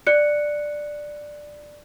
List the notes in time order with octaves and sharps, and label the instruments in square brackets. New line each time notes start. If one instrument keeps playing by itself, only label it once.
[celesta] D5 F#6 C#7